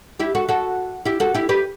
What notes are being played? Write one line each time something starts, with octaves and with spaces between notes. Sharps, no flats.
E4 G4
F#4 A4
F#4 A4
E4 G4
F#4 A4
E4 G4
G4 B4